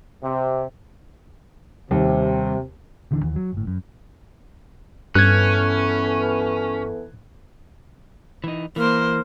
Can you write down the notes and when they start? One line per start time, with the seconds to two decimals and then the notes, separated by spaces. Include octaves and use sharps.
0.23 C3
1.91 D#2 C3 G3
3.11 D#1 D3 E3 D4
3.22 D#2 E3
3.36 F#3
3.53 G1 A2
3.67 F#2
5.15 G2 E3 B3 C#4 A4 F#6 G#6
8.44 E3 D#4
8.76 E3 A#3 A#4 C5